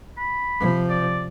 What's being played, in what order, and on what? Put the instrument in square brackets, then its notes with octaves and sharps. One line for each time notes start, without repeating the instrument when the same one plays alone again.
[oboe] B5
[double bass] C3 F3
[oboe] D5